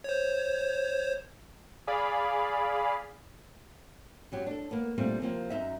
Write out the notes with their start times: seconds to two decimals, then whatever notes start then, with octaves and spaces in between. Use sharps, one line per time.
0.04 C5 C#5
1.87 G#4 D5 F5 B5
4.32 F#2 F#3 G4
4.46 D4 A4
4.71 A#3 B3
4.98 A#2 G3 A3 C4 D4 F4
5.21 C3 F3 A#3 C4
5.50 F#2 D#4 E5